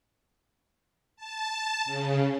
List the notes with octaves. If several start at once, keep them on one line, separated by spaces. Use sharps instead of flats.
A5
C#3